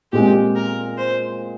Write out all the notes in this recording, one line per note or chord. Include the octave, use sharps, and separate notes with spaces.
A#2 G#3 C4 G4
A#4
C5